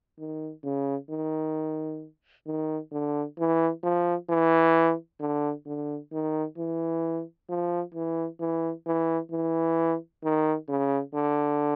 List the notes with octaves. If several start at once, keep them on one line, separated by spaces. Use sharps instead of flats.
D#3
C#3
D#3
D#3
D3
E3
F3
E3
D3
D3
D#3
E3
F3
E3
E3
E3
E3
D#3
C#3
D3